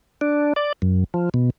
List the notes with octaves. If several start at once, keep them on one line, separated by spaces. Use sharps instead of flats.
D4
D5
F#2
F3
B2